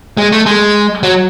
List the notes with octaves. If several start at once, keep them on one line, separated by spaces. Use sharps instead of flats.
G#3
A3
G#3
F#3